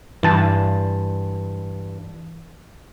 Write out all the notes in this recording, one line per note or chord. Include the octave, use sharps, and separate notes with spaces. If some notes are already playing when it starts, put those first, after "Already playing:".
G2 E3 A5